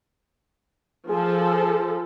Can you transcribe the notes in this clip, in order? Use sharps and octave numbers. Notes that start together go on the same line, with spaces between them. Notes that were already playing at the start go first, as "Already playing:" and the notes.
F3 G#4 A4